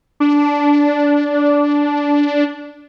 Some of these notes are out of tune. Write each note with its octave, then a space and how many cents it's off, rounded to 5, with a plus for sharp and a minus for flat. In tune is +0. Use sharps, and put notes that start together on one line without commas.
D4 -10